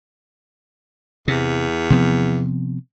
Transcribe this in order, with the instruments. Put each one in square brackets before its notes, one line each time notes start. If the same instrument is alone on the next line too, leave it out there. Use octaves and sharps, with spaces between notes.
[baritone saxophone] E2 [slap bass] C3
[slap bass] C3 F3 B3